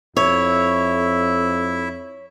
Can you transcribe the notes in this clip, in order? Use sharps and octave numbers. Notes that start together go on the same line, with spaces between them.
F2 E4 C#5 E5